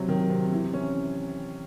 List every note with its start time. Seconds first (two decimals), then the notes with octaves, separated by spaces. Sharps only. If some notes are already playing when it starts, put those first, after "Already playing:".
Already playing: C3 F#3
0.08 D#3
0.30 C3
0.52 E3
0.73 C#4